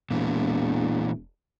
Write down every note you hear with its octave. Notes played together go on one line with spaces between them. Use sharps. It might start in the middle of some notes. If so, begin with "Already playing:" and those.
E1 A#2 E3